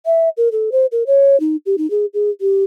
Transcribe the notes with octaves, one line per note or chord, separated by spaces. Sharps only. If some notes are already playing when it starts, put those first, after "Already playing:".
E5
A#4
A4
C5
A#4
C#5
D#4
G4
D#4
G#4
G#4
G4